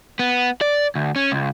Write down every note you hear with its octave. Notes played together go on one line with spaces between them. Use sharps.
B3
D5
D2
C#4
C#2